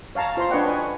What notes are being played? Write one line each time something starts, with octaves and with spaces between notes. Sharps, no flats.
C#5 F5 A5 A#5
F4 C5 E5 A#5 C6
D4 B4 C#5 D#5 F#5 G5
B4 C#5 G#5